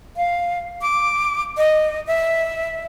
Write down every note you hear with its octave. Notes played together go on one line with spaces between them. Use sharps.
F5
D6
D#5
E5